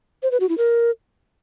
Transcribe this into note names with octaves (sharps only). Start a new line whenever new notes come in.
C5
B4
F#4
E4
A#4